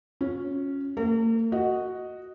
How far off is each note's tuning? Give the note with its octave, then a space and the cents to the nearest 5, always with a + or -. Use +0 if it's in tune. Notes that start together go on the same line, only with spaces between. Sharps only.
C#4 +0 F4 +40
A#3 -45 A#4 -40
F#4 +0 D#5 +0